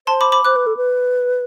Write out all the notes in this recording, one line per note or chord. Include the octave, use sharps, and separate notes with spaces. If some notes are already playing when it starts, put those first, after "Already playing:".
C5 A5 C6
B5 D6
B5 D6
C5 D6 F#6
B4
A4
B4